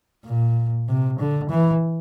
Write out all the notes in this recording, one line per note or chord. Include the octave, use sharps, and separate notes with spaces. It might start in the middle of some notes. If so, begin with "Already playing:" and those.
A#2
C3
D3
E3